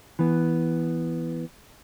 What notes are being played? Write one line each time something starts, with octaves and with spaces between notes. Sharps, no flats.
E3 B3